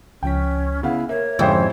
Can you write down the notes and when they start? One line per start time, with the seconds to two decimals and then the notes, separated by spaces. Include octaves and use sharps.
0.23 C#2 F3 C#4 G5 B6
0.83 C#3 B3 E4 F5 F#5
1.09 A#3 C#5 E5
1.39 F2 G#2 D3 F3 C#4 E4 G4 C5